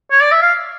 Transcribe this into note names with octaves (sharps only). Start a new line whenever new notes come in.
C#5
D5
E5
F5